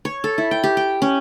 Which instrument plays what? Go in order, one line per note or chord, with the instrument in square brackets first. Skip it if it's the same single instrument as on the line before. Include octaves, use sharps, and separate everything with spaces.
[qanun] C#5
A4
E4
G5
G4
G5
C#4